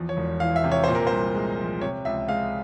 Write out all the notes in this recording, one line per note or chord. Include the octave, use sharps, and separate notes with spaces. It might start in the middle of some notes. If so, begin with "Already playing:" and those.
Already playing: E2 F3
C#5
E1
E3 F5
E5
C3
C#5
A#2 C5
A#4
C2 C5
G#3
F3
C3 C#5
C#2 E5
G#3 F5